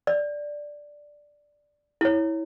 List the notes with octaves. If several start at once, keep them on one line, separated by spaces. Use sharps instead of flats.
D5
E4 C#5